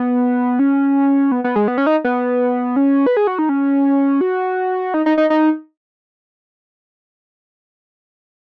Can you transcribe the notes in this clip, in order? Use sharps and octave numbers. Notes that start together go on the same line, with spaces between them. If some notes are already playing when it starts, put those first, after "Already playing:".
Already playing: B3
C#4
B3
B3
G#3
B3
C#4
D#4
B3
C#4
B4
G#4
F#4
D#4
C#4
F#4
D#4
D#4
D#4
D#4